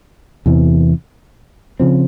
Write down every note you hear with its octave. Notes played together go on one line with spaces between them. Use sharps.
E2 C3 E3
C#3 F3 C4